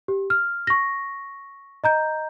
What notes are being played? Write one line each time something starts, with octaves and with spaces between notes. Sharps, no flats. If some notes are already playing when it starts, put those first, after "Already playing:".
G4
F6
C#6 A#6
D#5 A#5 G6